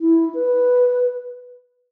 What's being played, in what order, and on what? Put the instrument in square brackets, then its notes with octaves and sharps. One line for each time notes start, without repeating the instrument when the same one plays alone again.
[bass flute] E4
B4